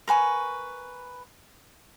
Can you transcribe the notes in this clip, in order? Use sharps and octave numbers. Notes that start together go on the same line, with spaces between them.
A#4 B4 G#5 C#6